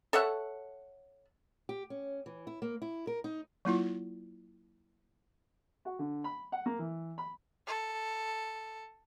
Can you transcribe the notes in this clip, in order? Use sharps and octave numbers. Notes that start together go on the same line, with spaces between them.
A4 C#5 E5 F#5
G4
C#4
E3
E4
A#3
E4
A#4
D#4
F#3 A#3 E4 F4
F#4
D3
B5
F#5
A#3
E3
B5
A4